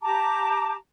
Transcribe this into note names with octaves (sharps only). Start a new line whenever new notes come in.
G4 A5 A#5 D6